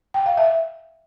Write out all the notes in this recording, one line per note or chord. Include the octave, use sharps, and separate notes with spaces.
G5
F5
E5